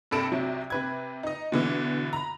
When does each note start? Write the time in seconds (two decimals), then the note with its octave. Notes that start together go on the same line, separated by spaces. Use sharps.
0.11 G2 C3 A4 D7 E7
0.32 C2 C3 F#3
0.70 C3 B4 G#6
1.23 D#4 D#5
1.52 B2 D3 E3
2.13 A#5 B5